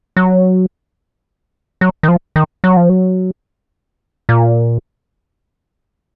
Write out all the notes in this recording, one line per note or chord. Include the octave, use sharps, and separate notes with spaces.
F#3
F#3
D#3
F3
D#3
F#3
F3
F#3
A#2